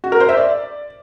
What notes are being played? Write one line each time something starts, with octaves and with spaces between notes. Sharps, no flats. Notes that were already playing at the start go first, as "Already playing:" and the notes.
F#4
A#4
C5
E5
D5